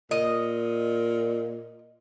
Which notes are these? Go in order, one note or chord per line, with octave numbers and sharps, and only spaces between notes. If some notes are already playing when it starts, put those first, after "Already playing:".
A#2 D#5